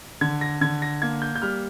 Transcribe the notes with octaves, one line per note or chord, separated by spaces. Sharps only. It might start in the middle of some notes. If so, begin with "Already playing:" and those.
D3 G#6
A#6
D3 G#6
A#6
A#3 G#6
G6
G6
G3 F6